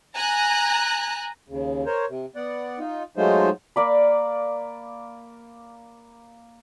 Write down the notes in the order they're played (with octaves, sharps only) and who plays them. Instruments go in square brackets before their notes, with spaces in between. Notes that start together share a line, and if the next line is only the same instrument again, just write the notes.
[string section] G#5 A#5 F#6
[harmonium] D#2 C#3
A#4 C5 C#5
C3
B3 D5 F#5
D#4 F4
F#3 G#3 A3 D#4 F4 C5
[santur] A#3 D5 B5